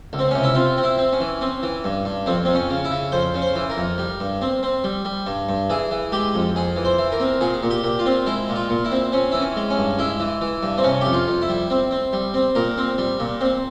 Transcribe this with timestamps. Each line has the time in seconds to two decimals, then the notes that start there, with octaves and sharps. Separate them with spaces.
0.13 C#2
0.19 C4
0.31 C3 C#4
0.44 E4
0.55 C4 F4
0.77 C4
0.84 E4
0.98 C4
1.13 C#4
1.20 E3
1.41 C4
1.63 E3
1.84 G2
2.05 G2
2.26 F2 C4
2.45 F2 C4
2.55 C#4
2.70 C#3
2.85 E4
2.91 C#3
3.12 F2 C5
3.34 C#3
3.42 C5
3.56 E3
3.70 A#4
3.77 F2
3.98 G3
4.20 G2
4.42 C4
4.63 C4
4.84 G3
5.05 G3
5.27 G2
5.49 G2
5.70 E3 G#4
5.91 E3
6.12 G#3 G4
6.34 F2
6.55 F2 G#4
6.76 E3
6.85 C5
6.98 E3
7.12 A#4
7.20 C4
7.41 A#2 G#4
7.63 A#2
7.70 G4
7.84 A#2
7.99 F4
8.06 C4
8.26 G#3 E4
8.49 A#2
8.56 F4
8.69 A#2
8.85 E4
8.91 C4
9.12 C4 C#4
9.32 E3 E4
9.41 C#4
9.56 G#3
9.70 C#4
9.77 G2
9.99 G#3 E4
10.20 E3
10.41 E3
10.63 G2
10.78 C4
10.84 C3 C#4
11.01 F2 G4
11.13 F4
11.28 F2
11.42 E4
11.49 G3
11.70 C4
11.91 C4
12.13 G3
12.34 C4
12.55 A#2 A#4
12.78 C4
12.98 G3
13.19 A#2
13.41 C4